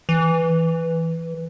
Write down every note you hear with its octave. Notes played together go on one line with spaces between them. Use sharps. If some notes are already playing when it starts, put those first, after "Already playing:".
E3